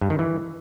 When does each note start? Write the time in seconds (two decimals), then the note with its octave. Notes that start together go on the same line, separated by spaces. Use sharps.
0.01 G2
0.10 D#3
0.19 E3